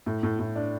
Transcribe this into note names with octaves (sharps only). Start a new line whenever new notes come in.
A2
A2
A2
D4